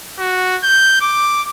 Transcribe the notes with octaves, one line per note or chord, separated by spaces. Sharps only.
F#4
G6
D6